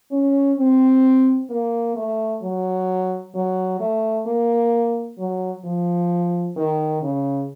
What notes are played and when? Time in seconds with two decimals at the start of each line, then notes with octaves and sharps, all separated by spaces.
0.11 C#4
0.58 C4
1.50 A#3
1.96 A3
2.42 F#3
3.34 F#3
3.80 A3
4.26 A#3
5.18 F#3
5.64 F3
6.56 D#3
7.02 C#3